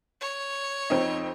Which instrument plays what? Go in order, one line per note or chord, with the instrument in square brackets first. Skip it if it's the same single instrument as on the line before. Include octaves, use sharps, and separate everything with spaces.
[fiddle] C#5
[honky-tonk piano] F2 C4 D#4